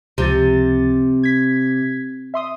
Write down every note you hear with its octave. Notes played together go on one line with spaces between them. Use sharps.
C#2 C3 F3 A6
G#6 B6
E5 C6 D#6